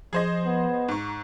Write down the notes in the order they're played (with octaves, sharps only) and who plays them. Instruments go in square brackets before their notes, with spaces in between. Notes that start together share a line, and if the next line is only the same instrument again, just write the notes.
[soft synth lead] F3 [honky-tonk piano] G#4 C5 D#5
[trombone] B3
[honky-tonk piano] G#2 C#6 [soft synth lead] A#5